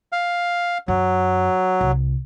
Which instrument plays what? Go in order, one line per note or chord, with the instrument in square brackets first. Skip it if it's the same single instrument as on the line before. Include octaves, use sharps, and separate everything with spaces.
[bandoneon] F5
[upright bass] F#2 [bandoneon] F#3
[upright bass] C2